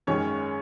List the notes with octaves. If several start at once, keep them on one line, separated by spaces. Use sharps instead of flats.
G#1 F#2 D#3 G#3 C#4 C#5